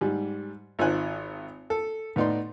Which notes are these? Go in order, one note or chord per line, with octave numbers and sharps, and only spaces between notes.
G#2 G3
G#1 D#4 F4 C5 G#5 F#6
A4
A2 B3 D#4 D5 C6